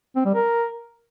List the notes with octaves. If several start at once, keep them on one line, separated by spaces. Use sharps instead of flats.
C4
G3
A#4